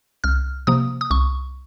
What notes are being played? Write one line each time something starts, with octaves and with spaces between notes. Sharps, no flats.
C2 F6
C3 F3 A#3 D#6
D#6
C2 C#6